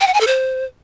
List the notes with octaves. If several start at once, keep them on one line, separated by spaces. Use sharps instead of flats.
G5
F#5
G#5
A4
C5